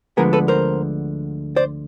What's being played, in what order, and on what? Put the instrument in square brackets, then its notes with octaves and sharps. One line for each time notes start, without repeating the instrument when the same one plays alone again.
[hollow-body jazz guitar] D2 D3 F3 G#3 B3 G#4 A#4
A4 B4
A#4 C5
C5 D5